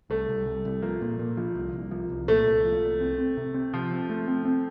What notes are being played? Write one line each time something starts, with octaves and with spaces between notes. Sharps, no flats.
C2 A3
C2
C2
C2
F3 A#3
A#2
A#2
F3
C2
C2
F3
C2
A#2 A3
C2
F3
C2
C4
C4
C3
C4
C3 F3
C4
A3
C4
C4